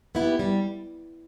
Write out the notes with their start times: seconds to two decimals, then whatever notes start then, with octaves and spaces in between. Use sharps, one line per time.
0.15 B3 E4 G4 B4
0.39 G3